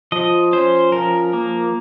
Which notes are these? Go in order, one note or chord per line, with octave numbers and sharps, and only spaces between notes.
F3 D#5
C#4 C5
F3 A#4
A#3